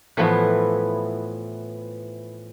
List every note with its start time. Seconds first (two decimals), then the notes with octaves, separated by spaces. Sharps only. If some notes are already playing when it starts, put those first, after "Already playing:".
0.17 A2 E3 F3 B3 E4